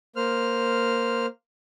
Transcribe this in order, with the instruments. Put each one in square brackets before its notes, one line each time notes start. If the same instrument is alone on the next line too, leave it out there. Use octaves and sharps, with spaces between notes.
[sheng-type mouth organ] A#3 C5 F6